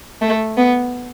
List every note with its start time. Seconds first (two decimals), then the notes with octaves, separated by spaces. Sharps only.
0.22 A3
0.57 B3